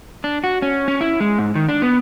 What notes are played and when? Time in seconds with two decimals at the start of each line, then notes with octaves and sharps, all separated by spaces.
0.24 D4
0.44 F#4
0.62 C#4
0.88 C#4
1.01 E4
1.20 G#3
1.39 G#2
1.55 D#3
1.69 D4
1.82 B3